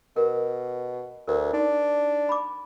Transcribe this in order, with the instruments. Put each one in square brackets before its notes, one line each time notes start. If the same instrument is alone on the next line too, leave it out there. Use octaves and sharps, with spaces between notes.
[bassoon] B2 [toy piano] A#4
[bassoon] D2 [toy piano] A#4
[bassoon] D4 [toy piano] D#4
[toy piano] B5 D6